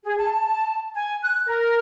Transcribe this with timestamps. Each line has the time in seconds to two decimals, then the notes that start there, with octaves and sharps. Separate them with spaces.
0.04 G#4
0.18 A5
0.94 G#5
1.23 F#6
1.45 A#4